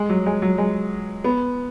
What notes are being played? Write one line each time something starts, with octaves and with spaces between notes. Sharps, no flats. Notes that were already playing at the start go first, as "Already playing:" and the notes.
Already playing: G#3
F#3
G#3
F#3
G#3
B3